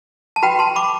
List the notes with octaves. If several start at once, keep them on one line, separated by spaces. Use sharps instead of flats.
A5
F#4 B4 G5 B5
A5 C6
B5 D6